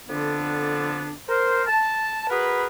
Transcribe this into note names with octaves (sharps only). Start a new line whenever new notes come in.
F2 D3 B3 D4
A#4 C5
A5
F#4 G#4 A#4 B4